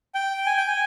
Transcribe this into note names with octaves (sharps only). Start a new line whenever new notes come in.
G5
G#5
G5
G#5